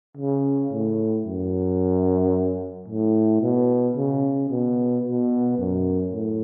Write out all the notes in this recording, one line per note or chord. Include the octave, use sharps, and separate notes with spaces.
C#3
A2
F#2
A2
B2
C#3
B2
B2
F#2
A2